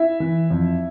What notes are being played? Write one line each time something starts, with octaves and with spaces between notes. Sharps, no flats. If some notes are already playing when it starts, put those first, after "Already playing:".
Already playing: E4 E5
E3
F2